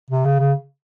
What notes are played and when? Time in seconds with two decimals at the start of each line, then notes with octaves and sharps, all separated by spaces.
0.11 C3
0.25 C#3
0.39 C#3